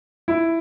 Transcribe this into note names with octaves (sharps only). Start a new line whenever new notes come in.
E4